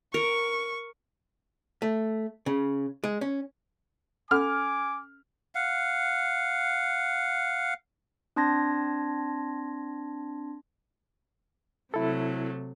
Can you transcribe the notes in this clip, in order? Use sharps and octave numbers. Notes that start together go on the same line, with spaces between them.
A#4 C#6
A3
C#3
G#3
C#4
C#4 A4 F#5 G#5 D6 F6
F5 F#5
C4 D4 A5 C6 G#6 A#6
C3 F#3 A3 E4 A4